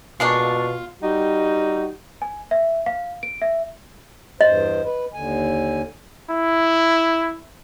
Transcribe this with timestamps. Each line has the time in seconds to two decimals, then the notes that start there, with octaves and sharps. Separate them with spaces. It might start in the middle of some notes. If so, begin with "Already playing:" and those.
0.20 B2 G#3 A#3 D4 F4 F5 C#6
1.02 G3 D#4 F#4 G4
2.22 G#5
2.51 E5
2.86 F5
3.23 D7
3.42 E5
4.41 E2 G2 C5 D#5
4.84 B4
5.14 D#2 D3 G#5
6.31 E4